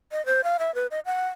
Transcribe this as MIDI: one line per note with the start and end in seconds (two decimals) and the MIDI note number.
0.12 0.24 75
0.26 0.44 72
0.44 0.57 77
0.59 0.74 76
0.75 0.87 71
0.91 1.00 75
1.06 1.27 78